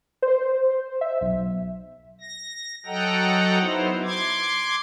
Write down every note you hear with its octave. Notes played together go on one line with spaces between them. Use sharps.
C5
E5
B1
A#6
F#3 A4 D#5 F#5 G5 A#5
F#3 B3 D#4 E4 C5
C6 D6 G#6